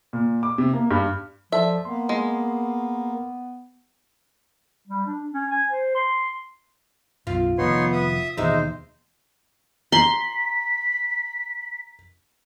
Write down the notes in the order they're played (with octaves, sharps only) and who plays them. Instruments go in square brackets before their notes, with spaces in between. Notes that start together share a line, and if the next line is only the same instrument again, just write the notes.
[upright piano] A#2
D6
C3
A#3
G2
[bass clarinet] F3 [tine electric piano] A4 D5 A5 [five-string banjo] E5
[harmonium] A#3 [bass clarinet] B3 [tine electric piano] C6
[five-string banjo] G#3
[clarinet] G3
D4
C#4
G#5
C5
C6
[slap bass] B1 F#2 [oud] F4
[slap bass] F1 D#3 F3 [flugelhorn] B3 [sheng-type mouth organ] D#4 C#5 C6
[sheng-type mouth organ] E5 D#6
[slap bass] D#2 B2 E3 [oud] G#3 G4 E5 [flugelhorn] D#4 [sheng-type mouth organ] C5
[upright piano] A#5 F#7 [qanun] C6 [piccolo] B6